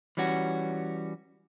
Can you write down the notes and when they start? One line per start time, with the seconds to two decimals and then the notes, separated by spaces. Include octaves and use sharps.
0.17 E3 G3 C#4 F#4